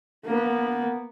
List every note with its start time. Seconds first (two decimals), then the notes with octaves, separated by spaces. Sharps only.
0.25 A#3 B3